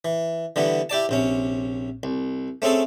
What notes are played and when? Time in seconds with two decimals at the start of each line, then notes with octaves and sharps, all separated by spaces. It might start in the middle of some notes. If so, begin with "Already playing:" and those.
0.05 E3
0.56 D3 E3 G3 B3
0.90 E4 G4 D5 A5
1.09 A#1 C3 C#4
2.03 C2
2.62 A3 C4 C#4 G#4 A4